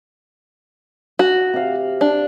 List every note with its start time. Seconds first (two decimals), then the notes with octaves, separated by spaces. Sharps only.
1.19 F#4
1.54 C3 F5
2.01 D4